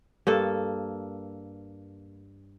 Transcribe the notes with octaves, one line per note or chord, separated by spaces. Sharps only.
G2 A#3 A4